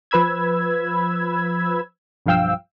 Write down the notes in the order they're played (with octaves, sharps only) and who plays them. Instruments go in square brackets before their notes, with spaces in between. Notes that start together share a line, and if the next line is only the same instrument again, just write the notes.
[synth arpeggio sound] F3 B4 B5 E6 G#6
B1 G2 F3 F5 G5 E6